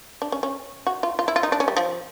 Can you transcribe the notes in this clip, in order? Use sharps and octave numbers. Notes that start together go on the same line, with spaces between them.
D4
C#4
C#4
F#4
F4
F4
E4
F4
D#4
D4
C#4
G3
F3